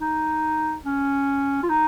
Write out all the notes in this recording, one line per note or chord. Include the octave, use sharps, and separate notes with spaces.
D#4
C#4
F4
D#4